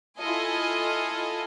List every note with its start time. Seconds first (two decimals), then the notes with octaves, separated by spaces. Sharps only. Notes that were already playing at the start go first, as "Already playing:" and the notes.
0.18 E4 F4 A4 D#5 G#5